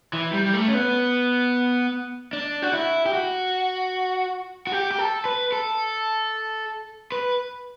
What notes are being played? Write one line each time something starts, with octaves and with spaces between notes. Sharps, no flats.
E3
G3
G3
A3
C#4
B3
D4
F#4
E4
G4
F#4
F#4
G4
G4
A4
B4
A4
B4